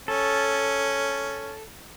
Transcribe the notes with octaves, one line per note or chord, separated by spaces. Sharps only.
C#4 A4